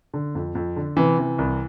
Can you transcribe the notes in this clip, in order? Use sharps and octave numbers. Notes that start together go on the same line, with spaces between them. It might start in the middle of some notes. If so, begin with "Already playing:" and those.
D3
F2
F2
D3
C3 E3
E3
C2